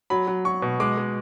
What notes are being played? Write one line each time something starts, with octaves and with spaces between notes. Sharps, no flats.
F#3 B5
F#3
F#3 C#6
B2
G#3 D6
G#3